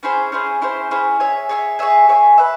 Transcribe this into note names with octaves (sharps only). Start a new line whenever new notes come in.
C#4 E4 G#4 C5
C#4 E4 G#4 C5
C#4 E4 G#4 C5
C#4 E4 G#4 C5
G#4 C#5 E5 G#5
G#4 C#5 E5 G#5
G#4 C#5 E5 G#5
G#4 C#5 E5 G#5
B4 E5